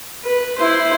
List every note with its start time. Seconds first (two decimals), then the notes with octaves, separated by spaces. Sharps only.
0.24 B4
0.58 E4 C5